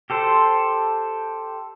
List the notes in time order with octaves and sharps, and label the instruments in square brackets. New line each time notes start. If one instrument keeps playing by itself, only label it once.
[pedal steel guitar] G4 A4 C5